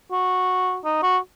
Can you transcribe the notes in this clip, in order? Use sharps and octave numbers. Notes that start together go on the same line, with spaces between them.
F#4
D#4
F#4